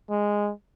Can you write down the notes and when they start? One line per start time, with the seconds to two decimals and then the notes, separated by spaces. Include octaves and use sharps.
0.10 G#3